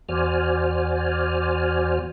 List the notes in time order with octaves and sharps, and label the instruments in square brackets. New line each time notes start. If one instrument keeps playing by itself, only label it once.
[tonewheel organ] E2 F#4 C5 D5 G#5 F6